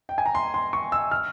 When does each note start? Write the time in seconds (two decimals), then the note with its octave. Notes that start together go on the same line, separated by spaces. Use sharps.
0.09 G5
0.18 G#5
0.26 A#5
0.35 C6
0.54 C6
0.73 C#6
0.92 E6
1.11 F6